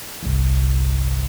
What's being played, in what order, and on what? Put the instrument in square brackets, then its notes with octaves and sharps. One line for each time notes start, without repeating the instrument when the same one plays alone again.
[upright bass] G1 C2